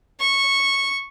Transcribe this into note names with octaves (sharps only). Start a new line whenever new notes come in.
C#6